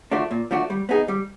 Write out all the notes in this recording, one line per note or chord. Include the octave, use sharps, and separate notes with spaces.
F3 A3 D4 F#4
A#2
F3 A3 D4 F#4
G3
B3 D#4 G#4
G3